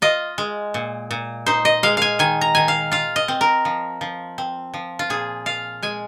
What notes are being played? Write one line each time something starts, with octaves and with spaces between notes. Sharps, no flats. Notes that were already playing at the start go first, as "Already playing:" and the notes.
F4 D#5
G#3
A#2
A#2
D#4 C5
D#5
G#3 F5
F5 G#5
D#3 G#5
A#5
D#3 G#5
F5
F4 F5
D#5
C4
A#4
F3
F3
C4
F3
F4
A#2 G#4
F4 F5
G#3 G#5